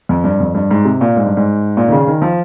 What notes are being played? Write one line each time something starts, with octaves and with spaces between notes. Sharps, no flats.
F2
G2
F2
G2
G#2
C3
A#2
G#2
G2
G#2
A#2
D#3
C#3
D#3
F3